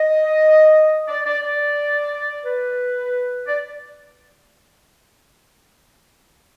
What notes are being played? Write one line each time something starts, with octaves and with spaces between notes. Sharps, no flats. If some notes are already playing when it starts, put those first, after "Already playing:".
Already playing: D#5
D5
D5
D5
B4
D5